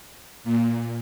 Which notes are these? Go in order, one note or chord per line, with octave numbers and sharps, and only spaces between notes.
A#2